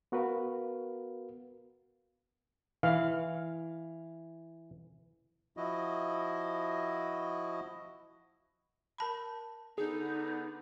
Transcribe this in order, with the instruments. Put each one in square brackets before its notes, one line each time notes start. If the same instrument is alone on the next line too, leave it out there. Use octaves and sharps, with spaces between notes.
[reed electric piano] B3 F#4 A#4 B4 F5
[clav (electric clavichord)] E3 [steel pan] F5
[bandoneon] F3 E4 F#4 D#5
[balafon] A#4 A5 B5
[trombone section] D3 B3 [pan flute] D#4 [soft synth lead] G#4